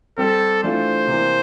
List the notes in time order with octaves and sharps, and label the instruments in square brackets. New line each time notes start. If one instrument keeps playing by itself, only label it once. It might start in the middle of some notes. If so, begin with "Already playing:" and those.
[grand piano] G3 C4 G4 [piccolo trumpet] A4
[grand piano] E3 A3 D4 F4 [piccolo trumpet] C5
[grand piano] C3 E3 A#3